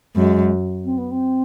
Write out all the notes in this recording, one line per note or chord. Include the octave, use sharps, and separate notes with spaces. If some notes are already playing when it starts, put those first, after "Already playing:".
F#2 G#3
C4
B3
C4